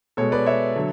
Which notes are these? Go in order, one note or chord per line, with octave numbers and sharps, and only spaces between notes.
B2 G#3 A4 C#5
B4 D5
C#5 E5
D3 F#3